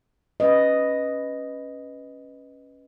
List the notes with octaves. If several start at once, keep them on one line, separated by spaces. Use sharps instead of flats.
C#4 B4 D#5